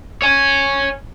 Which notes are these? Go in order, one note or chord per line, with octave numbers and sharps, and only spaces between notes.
C#5 G#5